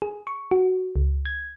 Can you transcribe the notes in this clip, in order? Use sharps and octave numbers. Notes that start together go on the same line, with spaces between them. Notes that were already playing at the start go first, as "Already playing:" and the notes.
G#4
C#6
F#4
C#2
G#6